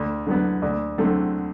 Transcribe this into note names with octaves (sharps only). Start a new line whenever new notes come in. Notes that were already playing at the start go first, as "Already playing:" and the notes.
Already playing: D2
D3 F#3 B3
D2
D3 F#3 A3 C4